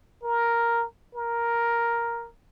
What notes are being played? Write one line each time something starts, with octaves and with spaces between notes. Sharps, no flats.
A#4
A#4